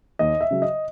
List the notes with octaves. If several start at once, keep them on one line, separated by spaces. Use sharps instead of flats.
D#2 D#5
E5
C#3 F#3
D#5